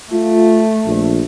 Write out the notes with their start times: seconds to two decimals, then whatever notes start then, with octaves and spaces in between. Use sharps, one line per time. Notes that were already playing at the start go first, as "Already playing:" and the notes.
0.11 A3 F4
0.85 A#1